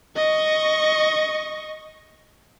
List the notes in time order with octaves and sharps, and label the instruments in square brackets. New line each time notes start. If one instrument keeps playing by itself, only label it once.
[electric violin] D#5 C#6